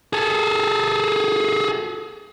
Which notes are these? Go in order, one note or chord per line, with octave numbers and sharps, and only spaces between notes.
G#4 A4